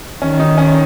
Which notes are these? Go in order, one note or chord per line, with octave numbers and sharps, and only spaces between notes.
D#3 C#4
D#4
C#4